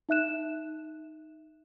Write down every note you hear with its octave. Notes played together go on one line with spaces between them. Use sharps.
D#4 E5 F#6 E7